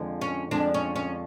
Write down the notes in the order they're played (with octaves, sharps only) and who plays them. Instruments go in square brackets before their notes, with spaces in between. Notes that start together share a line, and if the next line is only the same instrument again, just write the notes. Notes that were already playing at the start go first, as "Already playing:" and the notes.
Already playing: [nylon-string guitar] F2 D3 F3 G#3
[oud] C#4
[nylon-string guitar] F2 D3 F3 G#3 [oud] D4
[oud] C#4
C#4